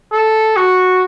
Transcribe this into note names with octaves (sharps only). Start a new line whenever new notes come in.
A4
F#4